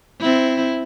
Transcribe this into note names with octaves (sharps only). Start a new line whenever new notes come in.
C4 E4